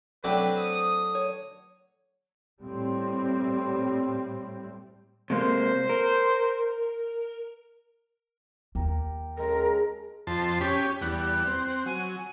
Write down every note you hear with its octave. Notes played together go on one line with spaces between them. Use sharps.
F#3 A3 C4 D4 B4
D#6
C#5
A2 G3 C4
C3 G#3 A#3 C5
A#4
D#2 G4 A#4
C#3 G#3 A4 A#4
F2 A5 C6
C#4 G4 B6
E2 G3 F#6
C4
F#6
F#3 G#5